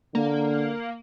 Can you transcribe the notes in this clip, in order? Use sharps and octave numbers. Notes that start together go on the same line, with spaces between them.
D3 A#3